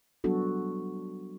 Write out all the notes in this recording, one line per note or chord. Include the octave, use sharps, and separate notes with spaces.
F#3 G3 B3 D4 F#4 A4